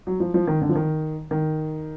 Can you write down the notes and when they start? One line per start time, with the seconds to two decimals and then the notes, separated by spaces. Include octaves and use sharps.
0.07 F#3
0.20 F3
0.34 F3
0.47 D#3
0.62 D3
0.69 F3
0.75 D#3
1.31 D#3